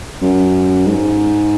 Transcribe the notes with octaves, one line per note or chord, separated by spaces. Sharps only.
F#2
G#2